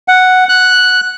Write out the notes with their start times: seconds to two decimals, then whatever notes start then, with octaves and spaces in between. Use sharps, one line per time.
0.08 F#5
0.49 F#6